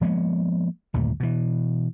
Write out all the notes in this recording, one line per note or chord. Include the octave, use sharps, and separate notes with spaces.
F3 G#3 A#3 B3
G1 D#2 A#2 A3
B2 E3